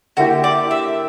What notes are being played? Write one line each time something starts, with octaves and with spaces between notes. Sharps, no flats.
D3 A#3 E4 F#4 G4
D5
E5